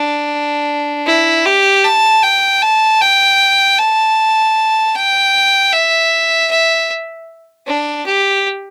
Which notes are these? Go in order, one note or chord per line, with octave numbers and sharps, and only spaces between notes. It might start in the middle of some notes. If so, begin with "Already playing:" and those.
Already playing: D4
E4
G4
A5
G5
A5
G5
A5
G5
E5
E5
D4
G4